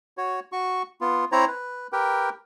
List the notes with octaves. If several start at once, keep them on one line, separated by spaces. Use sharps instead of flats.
F#4 C#5
F#4 C#6
B3 F4
C4 E4 C5 C#5 A#5
B4
G4 A#4 B4 G5